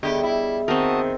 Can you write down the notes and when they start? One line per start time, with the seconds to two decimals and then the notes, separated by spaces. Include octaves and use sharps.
0.03 D3 G3 B3 G4 G#4 D#5 E5
0.23 E4
0.68 D#3 C4 F#4 A#4 A5 D#6